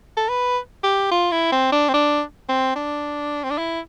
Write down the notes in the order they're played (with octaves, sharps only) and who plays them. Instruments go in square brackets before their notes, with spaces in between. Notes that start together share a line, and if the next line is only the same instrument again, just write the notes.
[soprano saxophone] A4
B4
G4
F4
E4
C4
D4
C4
D4
C4
D4
C4
D4
E4